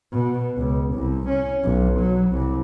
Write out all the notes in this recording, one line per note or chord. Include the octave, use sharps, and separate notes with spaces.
B2
C#2
C2
C#4
B1
F#3
C2